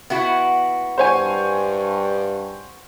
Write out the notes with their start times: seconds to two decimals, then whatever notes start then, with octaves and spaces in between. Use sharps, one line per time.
0.10 B3 E4 F#4
0.98 G2 C5 C#5 G#5